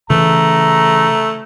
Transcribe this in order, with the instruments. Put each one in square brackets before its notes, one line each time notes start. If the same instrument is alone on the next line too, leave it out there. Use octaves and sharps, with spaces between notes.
[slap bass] C#3 E3 [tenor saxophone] A3 [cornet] A#5